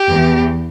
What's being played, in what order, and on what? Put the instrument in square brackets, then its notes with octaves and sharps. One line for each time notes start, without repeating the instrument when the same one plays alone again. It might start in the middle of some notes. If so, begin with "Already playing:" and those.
Already playing: [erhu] G4
[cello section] E2 E3